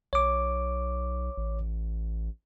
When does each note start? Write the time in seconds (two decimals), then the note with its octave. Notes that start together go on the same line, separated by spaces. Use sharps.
0.13 B1 C#5 D6
1.37 A1